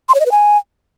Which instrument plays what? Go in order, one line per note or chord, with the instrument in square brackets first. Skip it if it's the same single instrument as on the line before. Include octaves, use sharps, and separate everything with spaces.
[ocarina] C6
C#5
D#5
B4
G#5